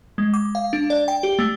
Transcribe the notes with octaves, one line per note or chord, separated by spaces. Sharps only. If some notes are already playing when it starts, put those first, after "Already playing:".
G#3
D6
F5
D4
D5
G5
G4
A3